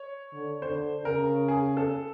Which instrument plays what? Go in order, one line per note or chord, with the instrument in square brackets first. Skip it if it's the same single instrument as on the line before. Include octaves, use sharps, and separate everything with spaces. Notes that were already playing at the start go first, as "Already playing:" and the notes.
Already playing: [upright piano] C#5
[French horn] D3
[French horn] D3 [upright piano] C5
[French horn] C#3 [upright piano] A#4
[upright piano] G#4
A4